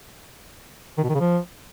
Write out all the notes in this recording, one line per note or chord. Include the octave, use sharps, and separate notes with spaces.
D#3
B2
D#3
C#3
F3